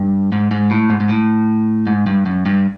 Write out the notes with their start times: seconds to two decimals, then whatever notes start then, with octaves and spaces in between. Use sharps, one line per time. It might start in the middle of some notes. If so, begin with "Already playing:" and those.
Already playing: G2
0.32 G#2
0.51 G#2
0.71 A2
0.90 G#2
1.00 G#2
1.09 A2
1.87 G#2
2.06 G2
2.26 F#2
2.46 G2